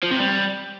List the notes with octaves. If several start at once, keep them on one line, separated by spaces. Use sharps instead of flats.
F3
C3
G3